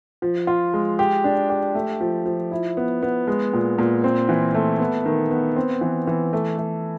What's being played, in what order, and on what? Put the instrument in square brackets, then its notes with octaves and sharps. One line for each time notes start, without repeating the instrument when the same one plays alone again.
[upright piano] F3
F4
G#3
G4
D4
G4
A3
F3
F3
E4
B3
B3
G#3
A#2
A#2
C4
E3
A3
B3
D#3
B3
C4
E3
E3
A3
A3